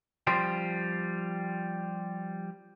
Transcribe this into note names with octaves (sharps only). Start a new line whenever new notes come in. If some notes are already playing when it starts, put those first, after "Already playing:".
F3 G3 C4